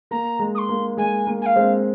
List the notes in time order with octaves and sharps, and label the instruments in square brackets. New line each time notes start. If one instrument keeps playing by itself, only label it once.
[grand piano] A#3 [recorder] A#5
[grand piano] G#3
[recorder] D#6
C6
[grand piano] A#3
[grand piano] G#3 [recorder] G#5
[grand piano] A#3
[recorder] G#5
F5
[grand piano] G#3 C4